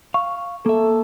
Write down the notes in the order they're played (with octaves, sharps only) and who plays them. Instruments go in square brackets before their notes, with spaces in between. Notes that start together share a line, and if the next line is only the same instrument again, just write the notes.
[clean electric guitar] F5 [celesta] C#6
[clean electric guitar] A#3 E5 [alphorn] A4